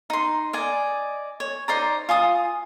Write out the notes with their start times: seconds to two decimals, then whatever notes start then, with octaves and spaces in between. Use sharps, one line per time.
0.10 D#4 C6
0.53 D5 D#5 G#5
1.40 C#5
1.68 D#4 C5 D5 A#5
2.09 F4 G#5 D#6